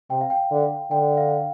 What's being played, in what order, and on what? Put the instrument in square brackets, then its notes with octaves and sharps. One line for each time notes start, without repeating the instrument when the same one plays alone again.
[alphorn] C3 [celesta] G5
[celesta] F5
G5
[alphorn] D3
[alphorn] D3 [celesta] G5
[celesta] F5